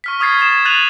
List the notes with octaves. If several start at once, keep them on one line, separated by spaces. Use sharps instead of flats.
C#6 F6 B6
C#6 D#6 F6 G#6 A6 C7
D#6 G#6 A6 E7
F#6 A6 D#7 F7 F#7